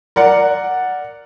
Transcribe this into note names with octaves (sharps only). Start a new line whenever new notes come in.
A#4 D5 F#5